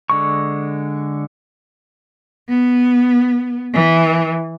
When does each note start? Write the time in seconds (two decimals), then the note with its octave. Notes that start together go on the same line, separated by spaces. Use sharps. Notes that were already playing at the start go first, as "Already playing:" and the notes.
0.10 D3 G#3 C#6
2.50 B3
3.74 E3